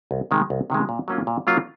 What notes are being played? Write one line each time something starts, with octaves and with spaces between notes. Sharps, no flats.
C2
C3 D#3 G#3
C2
C3 D#3 G#3
A#2
F#3 A#3 C#4 F4
A#2
F#3 A#3 C#4 F4